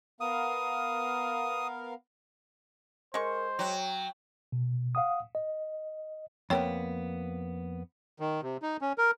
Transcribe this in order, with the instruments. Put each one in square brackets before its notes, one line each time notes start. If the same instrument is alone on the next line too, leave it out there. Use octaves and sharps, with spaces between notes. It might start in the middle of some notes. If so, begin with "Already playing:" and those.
[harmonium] B3 A#4 F5 [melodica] D#6
[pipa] G#3 C#6 [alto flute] A#4 [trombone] C5
[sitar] F#3 [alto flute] G5
[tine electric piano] B2
F5 F#5 D#6
D#5
[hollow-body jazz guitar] F2 A#3 B3 [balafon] C#5 G5
[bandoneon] D#3
C3
D#4
C#4
A#4